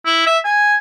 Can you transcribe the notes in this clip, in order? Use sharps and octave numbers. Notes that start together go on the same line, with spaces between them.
E4
E5
G#5